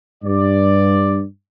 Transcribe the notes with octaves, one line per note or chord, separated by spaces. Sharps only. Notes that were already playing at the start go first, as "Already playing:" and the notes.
G2 D5